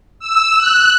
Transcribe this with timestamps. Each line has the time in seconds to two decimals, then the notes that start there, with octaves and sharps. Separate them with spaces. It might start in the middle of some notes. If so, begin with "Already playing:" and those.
0.19 E6
0.57 F#6